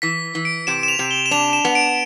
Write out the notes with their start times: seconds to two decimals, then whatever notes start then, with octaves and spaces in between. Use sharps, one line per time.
0.02 E3 B6
0.35 E3
0.45 D7
0.67 C3 E7
0.83 E7
0.88 F7
0.99 C3
1.11 G7
1.26 E7
1.31 D4 F7
1.53 E7
1.65 B3
1.75 D7